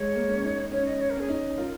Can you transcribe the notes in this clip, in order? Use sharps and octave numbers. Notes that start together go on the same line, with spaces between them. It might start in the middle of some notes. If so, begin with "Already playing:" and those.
Already playing: G#3 C#5
A#3
C#4
D#4
C#4 C#5
D#5
C#5
A#4
C#4 G#4
D#4
F4 A#4